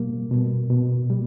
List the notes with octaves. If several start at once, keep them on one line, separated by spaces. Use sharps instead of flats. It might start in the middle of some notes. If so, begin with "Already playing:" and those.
Already playing: B2 G3 A#3
B2
B2
G3